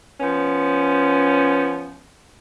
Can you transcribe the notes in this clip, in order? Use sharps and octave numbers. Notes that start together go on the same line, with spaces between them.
F3 B3 C#4